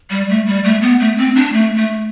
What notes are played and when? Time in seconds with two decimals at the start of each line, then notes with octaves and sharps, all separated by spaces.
0.10 G3
0.29 A3
0.46 G3
0.64 A3
0.82 B3
1.00 A3
1.18 C4
1.36 D4
1.53 A3
1.76 A3